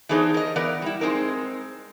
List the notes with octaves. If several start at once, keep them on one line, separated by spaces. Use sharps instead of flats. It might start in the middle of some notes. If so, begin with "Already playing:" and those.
E3 B3 D4 D#4 G#4 C5
A#4 D#5
E3 B3 A#4 D5
G3 E4
G#3 C4 D#4 A#4